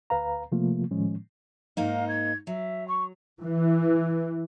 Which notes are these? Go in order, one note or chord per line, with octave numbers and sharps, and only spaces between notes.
D2 B4 F5 A#5
C3 F3 A3 A#3 F4
A2 D#3 F3 G#3 C#4
G#2 A#3 D#4 F5
G#6
F#3 E5
C#6
E3